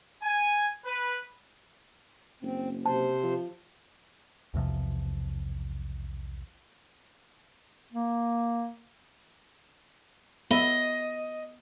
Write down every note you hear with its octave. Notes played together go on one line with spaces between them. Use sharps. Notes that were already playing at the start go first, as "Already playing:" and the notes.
G#5
B4
F#1 C4
C3 C5 A5
F3
B1 E2 C3 F3
A#3
B3 D#5 E5 B5